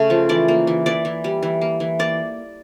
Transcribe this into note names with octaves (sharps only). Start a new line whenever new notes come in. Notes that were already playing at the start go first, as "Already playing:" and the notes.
Already playing: C#3 A3
F3
E3 D5
A#3
E3
E3 D5
E3
G3
E3
A#3
E3
A#3 D5